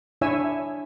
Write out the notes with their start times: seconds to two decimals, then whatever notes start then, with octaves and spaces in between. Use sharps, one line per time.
0.21 D4 E4 C#5 E5 G#5 E6